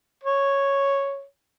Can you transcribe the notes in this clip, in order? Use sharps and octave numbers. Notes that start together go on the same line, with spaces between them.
C#5